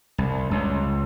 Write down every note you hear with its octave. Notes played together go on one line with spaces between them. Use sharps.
C2
C#2